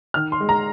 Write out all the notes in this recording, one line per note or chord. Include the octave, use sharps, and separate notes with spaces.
D#3 F6
C6
G#3
A#5